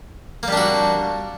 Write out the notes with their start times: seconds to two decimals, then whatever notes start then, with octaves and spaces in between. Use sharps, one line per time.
0.43 A#3
0.48 G3
0.53 D4
0.57 F#4